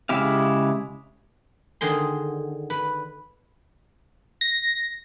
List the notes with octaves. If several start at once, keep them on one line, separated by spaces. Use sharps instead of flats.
C#3 G#3 E4 G4 F5
D3 D#3 G#4 C6
B4
A#6